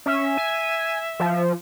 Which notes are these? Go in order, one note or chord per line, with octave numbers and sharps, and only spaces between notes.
C#4 E5
G#5
F3